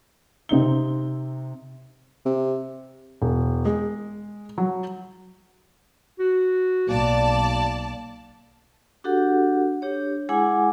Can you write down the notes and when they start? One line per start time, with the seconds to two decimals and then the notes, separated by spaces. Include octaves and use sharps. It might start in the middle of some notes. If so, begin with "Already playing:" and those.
0.49 C3 C4 D#4 G7
2.25 C3
3.22 E1
3.65 G#3
4.58 F#3
6.19 F#4
6.89 B1 A#3 D5 A5
9.04 D4 F#4 G4 A4 F#5
9.82 D4 G4 C#5
10.29 G#3 E4 G#4 F#5 G#5 D6